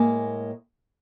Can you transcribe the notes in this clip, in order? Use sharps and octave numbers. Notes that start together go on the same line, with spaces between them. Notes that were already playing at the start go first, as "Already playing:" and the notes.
Already playing: A2 G#3 A#3